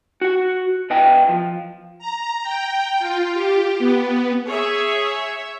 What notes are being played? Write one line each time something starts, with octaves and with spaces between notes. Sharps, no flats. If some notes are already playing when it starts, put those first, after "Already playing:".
F#4 F#5
B2 B4 D#5 G5
F3
A#5
G5
F4
G4
B3
G#4 C#5 E5